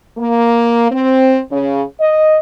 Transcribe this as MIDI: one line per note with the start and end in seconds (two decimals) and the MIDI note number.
0.18 0.90 58
0.91 1.39 60
1.51 1.82 49
1.99 2.39 75